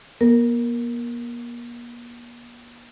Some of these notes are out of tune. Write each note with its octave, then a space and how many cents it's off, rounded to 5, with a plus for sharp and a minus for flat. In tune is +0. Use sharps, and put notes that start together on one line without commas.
A#3 +45 A#4 +0